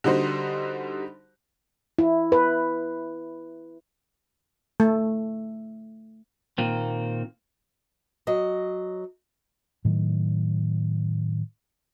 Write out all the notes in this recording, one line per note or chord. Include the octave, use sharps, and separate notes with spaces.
D3 G3 D#4 F#4 C5
E4
B4
A3
A#2 D#3 A#3 C4
F#3 D#5
A2 D#3 F#3